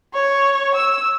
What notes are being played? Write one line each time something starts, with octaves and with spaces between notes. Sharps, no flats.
C#5
E6